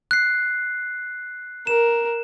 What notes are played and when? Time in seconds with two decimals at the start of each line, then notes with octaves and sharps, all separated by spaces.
0.11 F#6 C7
1.67 A#4 E7